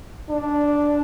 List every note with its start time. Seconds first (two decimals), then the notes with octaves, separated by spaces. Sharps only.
0.29 D4